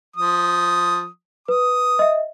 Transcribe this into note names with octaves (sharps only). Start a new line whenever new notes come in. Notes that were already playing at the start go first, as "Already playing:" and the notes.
F3 D#6
B4 D#6
D#5 E5